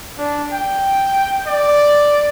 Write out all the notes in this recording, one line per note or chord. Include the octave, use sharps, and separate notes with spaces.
D4
G5
D5